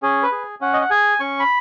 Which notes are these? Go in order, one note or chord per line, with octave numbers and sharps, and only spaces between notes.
C#4 G#4
B4
G#4
C#4 F#5
D#5
F#5
G#4 G#5
C#4 C#6
B5